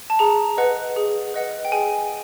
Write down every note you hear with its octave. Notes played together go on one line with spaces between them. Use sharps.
A5
G#4 A#5
B4 D#5 F#5
G#4
B4 D#5 F#5
G5
G#4 G#5